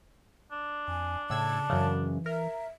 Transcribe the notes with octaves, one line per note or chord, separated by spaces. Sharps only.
D4
F2 G#5
A2 C#3 A5 E6 G#6
F#2 C#3 E3
A#4 E5